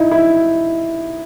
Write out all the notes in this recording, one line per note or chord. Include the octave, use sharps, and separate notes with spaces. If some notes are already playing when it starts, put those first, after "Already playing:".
Already playing: D#4 E4
E4